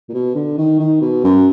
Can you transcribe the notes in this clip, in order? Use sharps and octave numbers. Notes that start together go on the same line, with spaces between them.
A#2
B2
D3
D#3
D#3
B2
F#2